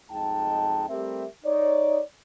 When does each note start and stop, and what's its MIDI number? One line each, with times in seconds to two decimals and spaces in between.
0.11 0.84 35
0.11 0.84 41
0.11 0.84 56
0.11 0.84 63
0.11 0.84 79
0.11 0.84 81
0.89 1.25 55
0.89 1.25 57
0.89 1.25 60
0.89 1.25 67
0.89 1.25 70
0.89 1.25 76
1.45 2.01 63
1.45 2.01 73
1.45 2.01 74